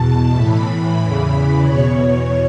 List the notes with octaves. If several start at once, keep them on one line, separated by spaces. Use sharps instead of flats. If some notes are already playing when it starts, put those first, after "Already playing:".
Already playing: E2 B2 A5
A2 E3 B5
E2 C#3 E3
E2 B2 C#5